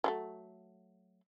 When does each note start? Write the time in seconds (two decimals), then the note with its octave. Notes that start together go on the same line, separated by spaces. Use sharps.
0.04 F#3 G#3 A3